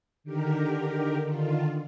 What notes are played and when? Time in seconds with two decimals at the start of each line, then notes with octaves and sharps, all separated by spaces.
0.24 D3 D#3 G4 A#4
1.24 D3 D#3 F4